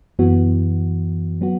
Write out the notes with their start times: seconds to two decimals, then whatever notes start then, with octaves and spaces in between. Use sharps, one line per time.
0.19 F#2 E3 B3 F#4
1.41 F#3 B3 F#4